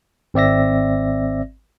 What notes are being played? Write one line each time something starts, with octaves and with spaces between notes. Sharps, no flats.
G#1 C4 D5 E5 A#6